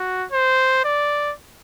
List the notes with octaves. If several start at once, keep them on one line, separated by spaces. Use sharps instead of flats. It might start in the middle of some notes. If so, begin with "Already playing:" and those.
Already playing: F#4
C5
D5